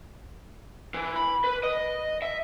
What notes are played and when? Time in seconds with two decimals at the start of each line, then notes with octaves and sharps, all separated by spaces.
0.94 E3
1.16 B5
1.44 B4
1.63 D#5
2.22 E5